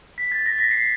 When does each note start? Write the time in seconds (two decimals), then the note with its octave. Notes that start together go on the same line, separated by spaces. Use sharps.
0.18 B6
0.32 A6
0.46 A#6
0.59 B6
0.71 C7